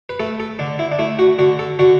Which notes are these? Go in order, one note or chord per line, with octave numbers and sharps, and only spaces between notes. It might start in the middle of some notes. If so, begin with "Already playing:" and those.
B4
A3 A4
A4
D3 D4
E4
D4
A3 E4
F#4
D3 F#4
A4
D3 F#4